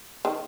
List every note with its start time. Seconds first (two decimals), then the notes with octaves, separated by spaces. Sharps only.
0.25 D#3